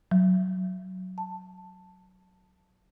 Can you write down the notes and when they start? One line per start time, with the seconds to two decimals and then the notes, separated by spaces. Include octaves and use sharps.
0.11 F#3
1.18 A5